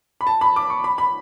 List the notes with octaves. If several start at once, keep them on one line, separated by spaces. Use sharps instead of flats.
B5
A5
B5
D6
C#6
B5
B5